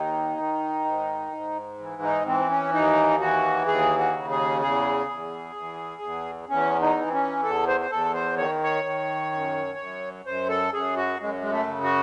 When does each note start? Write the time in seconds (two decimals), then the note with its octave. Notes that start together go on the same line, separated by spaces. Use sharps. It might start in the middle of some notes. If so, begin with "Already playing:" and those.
Already playing: D#2 D#3 D#4
0.38 D#3
0.85 G#2
1.32 G#2
1.79 E3
2.02 D#4
2.26 E3 C4
2.50 C#4
2.73 D#2 D#4
3.21 E3 F#4
3.67 D#2 G#4
3.98 F#4
4.14 C#3
4.31 G#4
4.62 E2 G#4
5.08 E2
5.56 E2
6.02 E2
6.49 E2 C#4
6.81 D#4
6.96 E3
7.08 C4
7.13 C#4
7.43 E2 A4
7.68 C5
7.81 C5
7.91 E2 A4
8.14 C5
8.38 D#3 C#5
8.63 C#5
8.84 D#3
9.32 F#2
9.78 F#2
10.26 F#2 C5
10.49 A4
10.74 F#2 G#4
10.97 F#4
11.20 F#2 G#3
11.41 G#3
11.51 A3
11.67 C#3
11.83 F#4